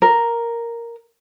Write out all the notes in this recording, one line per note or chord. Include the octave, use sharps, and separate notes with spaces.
A#4